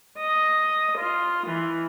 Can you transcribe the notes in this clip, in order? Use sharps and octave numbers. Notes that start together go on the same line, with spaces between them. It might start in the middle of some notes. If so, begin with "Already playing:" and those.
D#5
F4
E3